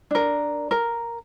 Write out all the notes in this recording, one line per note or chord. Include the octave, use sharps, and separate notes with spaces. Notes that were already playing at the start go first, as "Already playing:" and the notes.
D4 A#4
A#4